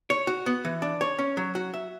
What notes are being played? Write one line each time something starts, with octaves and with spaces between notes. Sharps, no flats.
C#5
F#4
B3
E3
D4
C#5
C#4
F#3
F#4
E5